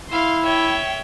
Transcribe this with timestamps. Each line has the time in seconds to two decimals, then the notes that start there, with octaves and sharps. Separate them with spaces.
0.12 E4 F5 C6
0.45 C#5 E5 G5